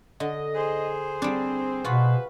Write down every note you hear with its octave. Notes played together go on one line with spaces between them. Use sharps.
D3 D#5
G#4 C5
G3 C4 D4
B2 F4 F#4 B4